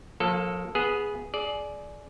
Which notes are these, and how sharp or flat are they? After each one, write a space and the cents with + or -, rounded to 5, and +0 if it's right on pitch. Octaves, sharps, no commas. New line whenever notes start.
F3 +40 A#3 +0 A4 +5
B3 -10 G#4 +0
G#4 +25 D5 +0